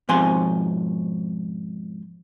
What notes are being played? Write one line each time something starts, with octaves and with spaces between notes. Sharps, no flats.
G#2 B2 F3 C4 G#5 C6